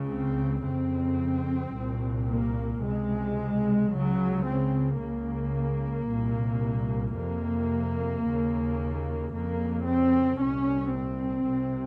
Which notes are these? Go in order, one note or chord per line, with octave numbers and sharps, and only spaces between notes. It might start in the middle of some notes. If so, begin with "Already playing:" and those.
Already playing: C#2 C#3
C4
F2 C#3 C4
C2 A#2
A#3
C#2 C3 G#3
C#2 C#3 F#3
C4
C#2 C#3 A#3
C2 A#2
F2 C3 A#3
D#2 C#3
F2 C#3 A#3
C4
C2 A#2 C#4
C4
C2 C3